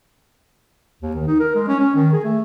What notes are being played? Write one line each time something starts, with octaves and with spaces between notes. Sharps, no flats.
D#2
D#3
D#4
A#4
G#3
C#4
C#4
D#3
G#4
A3